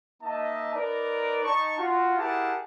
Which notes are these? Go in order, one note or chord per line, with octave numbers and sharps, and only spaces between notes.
A#3 D#4 D#5 E5 A5
D#4 A#4 B4 D5
D#4 A5 C#6
F4 F#4
E4 G4 G#4 A#4 F#5 A5